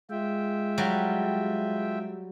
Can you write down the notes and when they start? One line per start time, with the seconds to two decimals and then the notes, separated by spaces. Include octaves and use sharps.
0.10 G#3 F4 E5 G5
0.78 F#3 G3